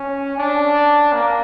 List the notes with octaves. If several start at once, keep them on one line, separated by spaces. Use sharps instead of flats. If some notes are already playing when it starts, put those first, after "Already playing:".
Already playing: C#4
D4
A#3